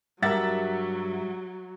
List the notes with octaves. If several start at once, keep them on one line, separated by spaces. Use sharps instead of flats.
G2 F#3 G3 A#4 E5 F#5 A6